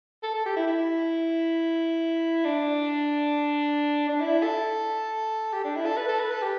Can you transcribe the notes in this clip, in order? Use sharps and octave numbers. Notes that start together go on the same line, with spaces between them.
A4
A4
G4
E4
E4
D4
D4
E4
A4
G4
D4
E4
A4
B4
A4
B4
A4
G4